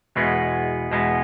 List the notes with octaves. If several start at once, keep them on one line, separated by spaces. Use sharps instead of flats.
E2 B2 G#3 B3
E2 B2 G#3 B3